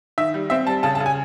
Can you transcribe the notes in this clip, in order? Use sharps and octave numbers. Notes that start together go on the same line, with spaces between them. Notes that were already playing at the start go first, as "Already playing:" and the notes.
D#3 E5
G3
C4 E5
G3 A5
C#3 A5
A5
C#3
G#5